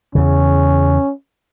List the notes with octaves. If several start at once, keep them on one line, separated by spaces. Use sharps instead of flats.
E2 C#3 C#4